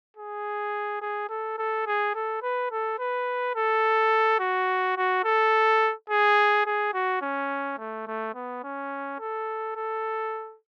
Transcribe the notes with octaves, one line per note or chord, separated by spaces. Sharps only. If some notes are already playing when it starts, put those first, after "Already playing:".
G#4
G#4
A4
A4
G#4
A4
B4
A4
B4
A4
F#4
F#4
A4
G#4
G#4
F#4
C#4
A3
A3
B3
C#4
A4
A4